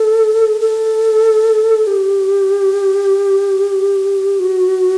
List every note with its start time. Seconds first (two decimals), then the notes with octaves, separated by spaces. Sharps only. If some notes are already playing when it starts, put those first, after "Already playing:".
Already playing: A4
0.61 A4
1.87 G4
4.40 F#4